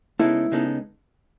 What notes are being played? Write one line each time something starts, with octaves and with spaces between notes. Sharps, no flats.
C#3 G#3 B3 D#4 E4 A4
C#3 G#3 B3 D#4 A4